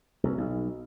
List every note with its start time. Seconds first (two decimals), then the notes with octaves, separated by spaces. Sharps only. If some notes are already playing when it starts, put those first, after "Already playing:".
0.23 C2
0.38 B1